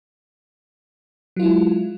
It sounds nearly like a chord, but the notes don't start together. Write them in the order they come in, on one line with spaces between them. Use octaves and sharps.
F#3 F4 E4 G#3